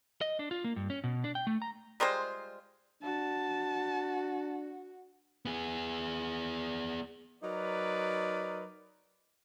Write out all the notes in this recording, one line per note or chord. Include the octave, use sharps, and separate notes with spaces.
D#5
D4
F4
A#3
G2
C#4
B2
D4
G5
A3
A#5
G3 G#3 F4 C5
D4 F#4 A5
B3 G#4
F#3 D#4 A#4 B4 D5